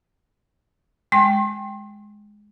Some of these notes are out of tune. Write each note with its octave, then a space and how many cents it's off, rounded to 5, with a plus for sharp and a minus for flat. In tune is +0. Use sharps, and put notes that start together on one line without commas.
G#3 +5 G5 -5 C6 +35